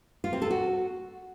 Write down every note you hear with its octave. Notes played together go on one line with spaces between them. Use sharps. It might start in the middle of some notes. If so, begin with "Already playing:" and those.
F4
C4
A4
F#4